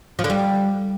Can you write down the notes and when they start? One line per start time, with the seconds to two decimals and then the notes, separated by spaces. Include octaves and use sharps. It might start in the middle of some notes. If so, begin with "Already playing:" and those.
0.19 F3
0.24 D3
0.30 G3